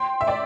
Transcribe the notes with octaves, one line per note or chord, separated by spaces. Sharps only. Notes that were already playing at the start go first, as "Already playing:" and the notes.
Already playing: G5 C6
E5
D5 G5